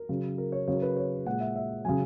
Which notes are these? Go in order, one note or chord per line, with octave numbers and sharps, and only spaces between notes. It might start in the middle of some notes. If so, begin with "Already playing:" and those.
Already playing: A#4
C#3 F#3
A#4
C#5
C#3 F#3 C#5
A#4
B4
C#5
A#2 G#3 F#5
E5
E5
C#3 F#3 G#5